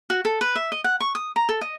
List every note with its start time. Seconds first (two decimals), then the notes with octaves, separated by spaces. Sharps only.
0.10 F#4
0.25 A4
0.41 B4
0.56 E5
0.72 D#5
0.84 F#5
1.00 C#6
1.15 D#6
1.36 A#5
1.49 A4
1.61 D#5